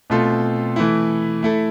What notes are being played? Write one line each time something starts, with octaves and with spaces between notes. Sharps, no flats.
B2 A3 C4 F4 A4
E3 A3 E4
A3 E4 A4